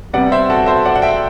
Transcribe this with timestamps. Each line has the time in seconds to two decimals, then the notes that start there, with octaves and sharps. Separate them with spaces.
0.13 C3 G3 B3 D5 F#5
0.32 C5 E5
0.50 F#4 A4
0.66 C5 E5
0.85 D5 F#5
0.96 F#5
1.02 E5 G5